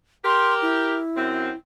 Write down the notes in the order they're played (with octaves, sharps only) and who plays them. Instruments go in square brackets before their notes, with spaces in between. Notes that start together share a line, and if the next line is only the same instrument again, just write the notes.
[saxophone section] G4 A#4 [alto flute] C6
[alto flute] E4
[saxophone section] F#2 C4